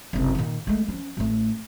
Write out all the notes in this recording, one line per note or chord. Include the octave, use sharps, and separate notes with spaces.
F#1 C2
A#2 D#3
G#3 A3
F3 C#4
A1 A3